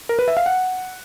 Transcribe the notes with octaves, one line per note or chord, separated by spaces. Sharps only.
A#4
B4
E5
F5
F#5